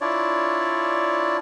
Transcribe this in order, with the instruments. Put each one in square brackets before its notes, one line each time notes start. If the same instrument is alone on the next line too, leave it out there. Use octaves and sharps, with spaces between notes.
[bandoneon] D4 E4 F4 C#5 D5